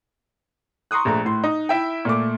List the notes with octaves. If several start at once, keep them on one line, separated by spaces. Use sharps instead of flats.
A#5 C6 C#6 D#6 F#6
A#1 A3 A#5
A2 C6
D#4
E4 E5 G5
A#2 A3 D6